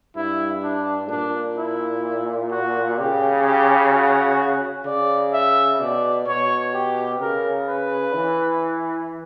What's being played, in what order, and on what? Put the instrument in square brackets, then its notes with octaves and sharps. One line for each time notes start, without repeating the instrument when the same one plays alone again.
[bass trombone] G2 [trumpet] E4
[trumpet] D4
[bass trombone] A#2 [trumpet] D4
[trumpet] E4
F#4
[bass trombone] C#3 [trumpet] G4
[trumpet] G4
F#4
[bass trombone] C#3 [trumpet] D5
[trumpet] E5
[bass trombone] B2 [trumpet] D5
[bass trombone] B2 [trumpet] C#5
[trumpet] G4
[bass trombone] C#3 [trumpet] A#4
[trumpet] B4
[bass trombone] E3